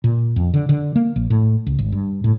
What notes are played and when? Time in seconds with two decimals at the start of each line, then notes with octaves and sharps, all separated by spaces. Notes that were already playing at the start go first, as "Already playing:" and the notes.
0.04 A#2
0.36 F2
0.54 D3
0.69 D3
0.96 A#3
1.16 A#1
1.30 A2
1.66 C#2
1.79 G#1
1.92 G2
2.24 A2